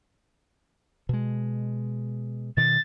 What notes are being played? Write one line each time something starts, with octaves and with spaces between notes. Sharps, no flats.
B2 G#3
B2 D#3 A6